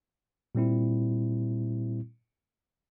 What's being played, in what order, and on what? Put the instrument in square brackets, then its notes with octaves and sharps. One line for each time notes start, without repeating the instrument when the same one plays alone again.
[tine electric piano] A#2 G3 C4 E4